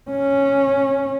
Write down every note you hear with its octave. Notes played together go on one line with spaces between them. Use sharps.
C#4